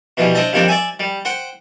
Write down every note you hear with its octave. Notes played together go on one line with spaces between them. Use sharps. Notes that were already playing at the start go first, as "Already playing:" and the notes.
B2 E3 F3 G3
D4 C5 D#5 E5 A5
G2 D#3 F3 C4 D4
D5 E5 G#5
G3
C5 F#5 G5